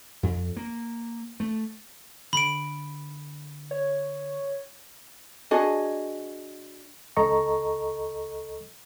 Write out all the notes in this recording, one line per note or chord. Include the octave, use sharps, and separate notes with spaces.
F2
A#3
A3
D3 B5 D7
C#5
D4 F#4 G#4 D#5
C#2 A4 D#5 A#5 C#6